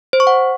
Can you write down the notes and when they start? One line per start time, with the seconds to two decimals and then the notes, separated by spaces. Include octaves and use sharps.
0.13 C5
0.20 C#6
0.27 F#5